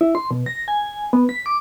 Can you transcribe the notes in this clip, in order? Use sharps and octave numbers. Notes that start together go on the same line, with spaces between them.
E4
C6
B2
A#6
G#5
B3
B6
D6